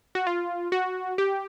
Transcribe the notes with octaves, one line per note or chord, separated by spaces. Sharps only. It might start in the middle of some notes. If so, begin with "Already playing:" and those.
F#4
F4
F#4
G4